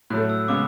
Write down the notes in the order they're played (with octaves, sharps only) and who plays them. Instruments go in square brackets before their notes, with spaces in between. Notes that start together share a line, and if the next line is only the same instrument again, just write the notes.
[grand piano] A2 F#3 A3 [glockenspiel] F#6
[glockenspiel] E6
[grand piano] C#3 G#3 B3 [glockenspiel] D6